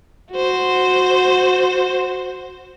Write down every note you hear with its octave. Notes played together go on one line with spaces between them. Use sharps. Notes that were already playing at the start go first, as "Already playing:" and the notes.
F#4 C5